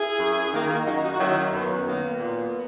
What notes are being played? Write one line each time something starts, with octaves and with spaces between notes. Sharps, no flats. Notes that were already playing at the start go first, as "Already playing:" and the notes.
Already playing: E4 G#4
F#2
D#3 A#3
F#2 D#4 F#4
D#4 F#4
F#4
D#3 F#3 A#3 C#4 E4
F#2 B3
D#3 F#3 A#3
A#2